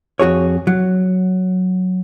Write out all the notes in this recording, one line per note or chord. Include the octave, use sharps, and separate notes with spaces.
F2 F#4 G#4 C#5
F#3